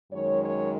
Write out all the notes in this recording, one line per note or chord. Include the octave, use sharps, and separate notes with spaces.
F#2 D#3 G#3 C#5
C#5